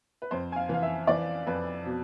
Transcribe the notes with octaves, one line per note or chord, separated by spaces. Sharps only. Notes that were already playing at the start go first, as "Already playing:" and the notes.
B4
F2 C5
G#5
F5
E3 F5
E5
E3 D5
F2 B4
B2